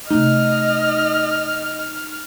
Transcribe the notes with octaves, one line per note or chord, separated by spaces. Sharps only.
C3 A3 D#4 D#5 F6